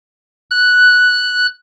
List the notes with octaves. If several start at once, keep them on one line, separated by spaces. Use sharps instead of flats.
F#6